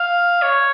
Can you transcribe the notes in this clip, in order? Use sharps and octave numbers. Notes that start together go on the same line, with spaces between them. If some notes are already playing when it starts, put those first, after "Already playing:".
Already playing: F5
C#5